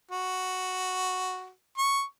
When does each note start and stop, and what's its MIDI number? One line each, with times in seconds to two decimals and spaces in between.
0.11 1.50 66
1.78 2.02 85